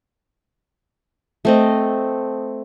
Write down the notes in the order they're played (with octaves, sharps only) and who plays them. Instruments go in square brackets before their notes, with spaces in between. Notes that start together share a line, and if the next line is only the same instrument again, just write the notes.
[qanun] A3 C4 D#5